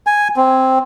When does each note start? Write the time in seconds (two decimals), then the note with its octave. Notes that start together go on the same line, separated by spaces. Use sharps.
0.07 G#5
0.36 C4